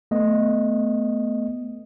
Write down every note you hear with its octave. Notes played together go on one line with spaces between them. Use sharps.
A3 B3 D#5